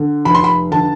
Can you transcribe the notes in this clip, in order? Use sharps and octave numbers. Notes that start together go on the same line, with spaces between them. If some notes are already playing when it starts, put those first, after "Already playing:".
Already playing: D3
F1 B5
C6
B5
D3 A5